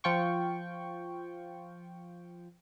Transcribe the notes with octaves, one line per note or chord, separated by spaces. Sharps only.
F3 F4 G5 C#6